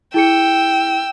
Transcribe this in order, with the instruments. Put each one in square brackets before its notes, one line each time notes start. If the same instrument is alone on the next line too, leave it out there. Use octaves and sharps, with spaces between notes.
[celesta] E4 G#4 C#7 [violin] G5 E6